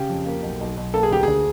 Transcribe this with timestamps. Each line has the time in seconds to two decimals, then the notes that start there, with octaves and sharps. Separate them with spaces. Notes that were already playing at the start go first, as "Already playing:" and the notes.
Already playing: C#3 G4
0.09 F2
0.26 A#3
0.43 B1
0.61 B1
0.77 B1
0.94 A#3 A4
1.03 G#4
1.11 D2 G4
1.23 D3 G#4